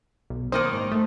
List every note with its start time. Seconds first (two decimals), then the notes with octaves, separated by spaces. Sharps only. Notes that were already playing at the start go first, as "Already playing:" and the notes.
0.30 B1
0.52 D#3 A#3 D#4 C5 D#6
0.73 G#2
0.92 A3